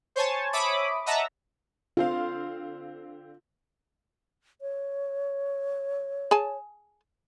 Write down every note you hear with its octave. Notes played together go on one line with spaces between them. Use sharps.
C5 C#5 G#5 A5
C#5 E5 B5 D6 D#6
D#5 E5 F#5 A5 A#5
D3 C4 F4 F5
C#5
G#4 G#5 A5